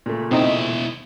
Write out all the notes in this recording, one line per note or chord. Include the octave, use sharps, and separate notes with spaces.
A#2 C#3 A3
B2 C4 D#4 E4 D#5